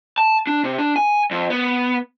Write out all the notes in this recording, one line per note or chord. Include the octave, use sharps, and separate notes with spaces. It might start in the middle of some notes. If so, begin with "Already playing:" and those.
A5
D4
C3
D4
G#5
F2
B3